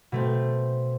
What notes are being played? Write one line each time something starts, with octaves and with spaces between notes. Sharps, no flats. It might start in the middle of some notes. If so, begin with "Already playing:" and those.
B2 A3 C4